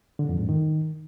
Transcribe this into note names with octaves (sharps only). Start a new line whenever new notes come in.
D3
F2
G#2
D#3